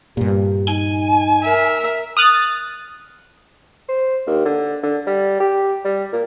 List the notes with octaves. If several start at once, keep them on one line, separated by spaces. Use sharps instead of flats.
G2 A#2 G4
D#4 G#5
A#4 E5
D#6 F6 F#6 A6
C5
D#2
D3
D3
G3
G4
G3
A#2